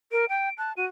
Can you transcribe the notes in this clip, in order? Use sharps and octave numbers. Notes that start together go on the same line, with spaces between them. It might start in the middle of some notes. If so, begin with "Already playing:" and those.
A#4 D7
G5 D7
A5 F#6
F#4 D#7